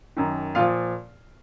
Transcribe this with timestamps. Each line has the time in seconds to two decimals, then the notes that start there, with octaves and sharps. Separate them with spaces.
0.17 F#2 D#3
0.55 A#2 F3 F4 F5